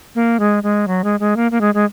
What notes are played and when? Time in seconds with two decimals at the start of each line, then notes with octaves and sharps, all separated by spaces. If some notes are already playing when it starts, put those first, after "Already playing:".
0.15 A#3
0.40 G#3
0.63 G#3
0.88 F#3
1.04 G#3
1.20 G#3
1.36 A#3
1.51 A#3
1.61 G#3
1.74 G#3